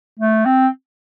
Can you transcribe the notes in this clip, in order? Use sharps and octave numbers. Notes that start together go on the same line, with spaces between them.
A3
C4